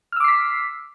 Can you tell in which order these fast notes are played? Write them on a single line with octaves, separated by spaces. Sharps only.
F6 E6 D6 C7 B6